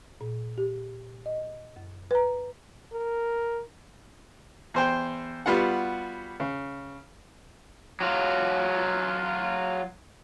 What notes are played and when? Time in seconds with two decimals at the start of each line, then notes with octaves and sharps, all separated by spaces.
0.21 A#2
0.58 G4
1.26 D#5
1.76 F#2
2.11 B4 A#5
2.93 A#4
4.74 E2 C5 G5
5.46 G3 B3 F4 F#4 F#5
6.40 C#3
8.00 F#3 F4